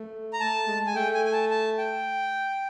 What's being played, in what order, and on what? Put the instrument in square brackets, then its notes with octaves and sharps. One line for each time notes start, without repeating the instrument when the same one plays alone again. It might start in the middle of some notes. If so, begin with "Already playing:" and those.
Already playing: [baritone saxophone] A3
[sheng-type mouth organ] A#5
[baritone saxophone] A3 [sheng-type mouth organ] A5
[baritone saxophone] G#3
[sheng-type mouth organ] G#5
[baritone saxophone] A3 [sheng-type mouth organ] G5
[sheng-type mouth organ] G#5
G#5
A5
A5
G5